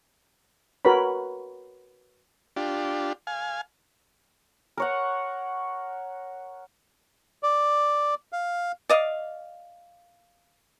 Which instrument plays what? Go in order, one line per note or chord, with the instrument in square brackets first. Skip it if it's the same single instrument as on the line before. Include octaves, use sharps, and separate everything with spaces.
[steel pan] F#4 A#4 B4 C#5 B5
[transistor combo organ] D4 F4 G4
F5 G#5
[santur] A#4 C#5 F#5
[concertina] D5
F5
[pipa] D5 D#5 F5